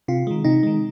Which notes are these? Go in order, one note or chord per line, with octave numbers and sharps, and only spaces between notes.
C3 F4
D#3 G#3
C3 D#4
D#3 G#3